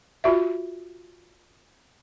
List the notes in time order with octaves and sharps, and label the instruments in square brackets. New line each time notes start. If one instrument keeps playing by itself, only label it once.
[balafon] F4 F#4 E5